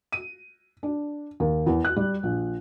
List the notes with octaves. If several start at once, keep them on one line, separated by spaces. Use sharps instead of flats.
D#7
D4
D#2
E2
F#6
G3
A#1